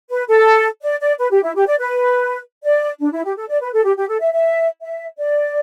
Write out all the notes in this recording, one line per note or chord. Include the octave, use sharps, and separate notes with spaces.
B4
A4
D5
D5
B4
G4
E4
G4
D5
B4
D5
D4
E4
G4
A4
D5
B4
A4
G4
G4
A4
E5
E5
E5
D5